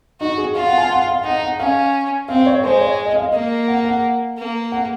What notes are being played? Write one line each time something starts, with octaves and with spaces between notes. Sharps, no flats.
D#4 F#4
G#4
F4 F5
F#5
G#5
F#5
F5
D#4 F#5
F#5
C#4 F5
C4 F5
C#5
G#3 C5
C#5
D#5
F5
D#5
A#3
F#5
F#5
A#3
F#5